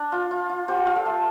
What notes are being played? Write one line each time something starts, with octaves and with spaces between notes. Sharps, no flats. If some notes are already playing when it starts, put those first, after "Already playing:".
Already playing: D4
F4
F4
F4
F4 G4 C5
F4 F5
A4 D5
A3